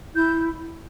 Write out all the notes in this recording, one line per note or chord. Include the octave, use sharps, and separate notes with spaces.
E4 G6